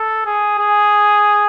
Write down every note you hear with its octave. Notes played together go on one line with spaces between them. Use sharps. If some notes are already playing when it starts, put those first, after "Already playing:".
Already playing: A4
G#4
G#4